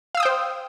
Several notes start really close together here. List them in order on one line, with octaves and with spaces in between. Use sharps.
F5 E6 D#6 G5 C5